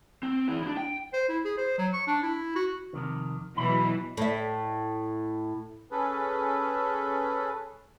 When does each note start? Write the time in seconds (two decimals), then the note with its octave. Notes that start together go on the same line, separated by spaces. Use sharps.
0.23 C4
0.47 E2 E4
0.63 D4 E4
0.77 G5
1.13 C5
1.29 E4
1.45 G#4
1.57 C5
1.78 F#3
1.93 C#6
2.07 D4
2.23 E4
2.56 F#4
2.93 F2 C3 D#3
3.57 B2 E3 F#3 B5
4.17 A2 E5
5.91 C#4 G#4 A4 B4